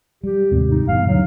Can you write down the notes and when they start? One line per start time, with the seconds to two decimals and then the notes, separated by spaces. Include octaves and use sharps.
0.24 G3 G4
0.51 D#2 G#2 C3
0.71 D#4
0.88 G2 B2 E3 F5
1.07 D2 D3 F#3